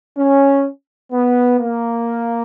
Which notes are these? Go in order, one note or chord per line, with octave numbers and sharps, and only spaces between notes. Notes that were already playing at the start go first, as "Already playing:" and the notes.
C#4
B3
A#3